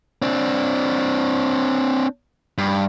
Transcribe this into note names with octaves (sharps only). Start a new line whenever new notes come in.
C4 D4
G2